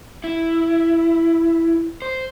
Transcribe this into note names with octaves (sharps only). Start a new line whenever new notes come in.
E4
C5